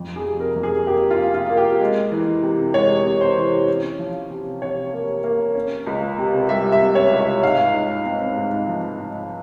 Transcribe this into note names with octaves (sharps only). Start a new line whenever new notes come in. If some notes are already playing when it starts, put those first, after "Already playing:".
Already playing: F2
G#4
C3
A#4
F2
G#4
A#3 G4
F4
C3
F4
A#3
G4
G#3
E3
C3
G#3 C#5
C3
C5
E3
C#4
F3
C3
C3 C#5
A#3
A#3
C#4
C#2
C3
G3 E5
E5
C3
C#5
C#2
E5
G#2 F5
G#2
C4
G#2
F3
G#2